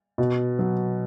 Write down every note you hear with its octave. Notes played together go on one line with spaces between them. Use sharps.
B2
F#3